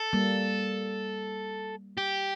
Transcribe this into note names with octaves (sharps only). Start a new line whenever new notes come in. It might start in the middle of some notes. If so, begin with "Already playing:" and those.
Already playing: A4
G3 A#3
G4